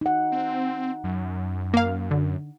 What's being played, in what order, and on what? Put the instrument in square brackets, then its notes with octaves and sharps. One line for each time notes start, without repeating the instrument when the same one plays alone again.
[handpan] D#4 F#5
[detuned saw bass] C4
F#2
[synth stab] A#3 F5
D3